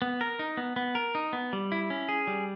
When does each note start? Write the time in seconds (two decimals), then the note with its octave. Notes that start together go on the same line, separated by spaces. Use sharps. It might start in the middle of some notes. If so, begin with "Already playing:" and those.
0.02 B3
0.21 A#4
0.39 D#4
0.57 B3
0.76 B3
0.95 A#4
1.15 D#4
1.33 B3
1.53 G3
1.72 E4
1.90 C#4
2.09 G#4
2.27 G3